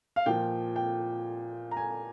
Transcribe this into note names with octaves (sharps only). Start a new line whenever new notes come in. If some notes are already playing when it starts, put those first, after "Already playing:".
F5
A#2 F3 G5
G5
A#5
G#5